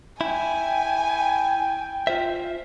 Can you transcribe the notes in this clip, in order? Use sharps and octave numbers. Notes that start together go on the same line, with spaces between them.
E4 G5 G#5
F4 C5 E5